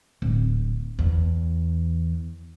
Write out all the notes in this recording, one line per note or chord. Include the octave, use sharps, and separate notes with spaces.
D1
E2